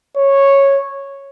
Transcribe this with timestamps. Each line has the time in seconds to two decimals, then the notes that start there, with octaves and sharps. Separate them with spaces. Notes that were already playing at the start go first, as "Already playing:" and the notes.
0.17 C#5